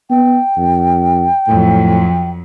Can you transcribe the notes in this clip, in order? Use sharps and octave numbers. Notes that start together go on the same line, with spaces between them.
B3 G5
F2
F2 A2 F#3